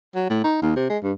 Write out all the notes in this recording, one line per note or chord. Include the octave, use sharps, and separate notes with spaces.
F#3
A2
D#4
D#2
C3
G#3
G2